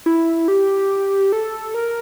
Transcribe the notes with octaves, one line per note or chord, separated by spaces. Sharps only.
E4
G4
A4
A#4